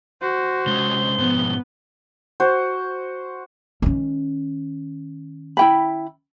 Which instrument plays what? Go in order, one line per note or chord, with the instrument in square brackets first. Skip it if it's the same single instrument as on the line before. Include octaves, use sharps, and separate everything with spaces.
[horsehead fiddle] F#4 [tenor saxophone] C5
[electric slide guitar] C3 G#3 C#4 [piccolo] G7
[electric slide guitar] G#2 B2 F3 [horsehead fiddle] B3
[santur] F#4 C5
[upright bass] D#3 C#4
[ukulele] E4 G5 B5